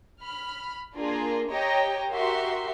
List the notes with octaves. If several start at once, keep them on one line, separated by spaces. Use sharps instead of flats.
B5 F6
A#3 D4 F4 G#4
G4 C#5 D#5 G5 A#5
F#4 G4 A#4 E5 C6